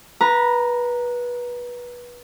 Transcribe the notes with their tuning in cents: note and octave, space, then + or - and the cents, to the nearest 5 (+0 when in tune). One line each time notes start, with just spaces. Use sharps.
B4 -20 A#5 +0